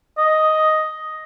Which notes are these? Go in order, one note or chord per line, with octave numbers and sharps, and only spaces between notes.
D#5